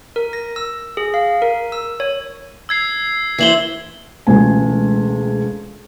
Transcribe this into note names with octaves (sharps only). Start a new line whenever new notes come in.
A#4
A#6
E6
G#4
F5
A#4
E6
C#5
E6 G#6 C7
E3 E4 C5 C7 F#7 G7
E1 C#2 A3 G#5